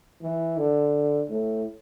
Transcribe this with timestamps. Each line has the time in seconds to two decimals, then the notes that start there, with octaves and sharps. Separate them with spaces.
0.22 E3
0.57 D3
1.30 A2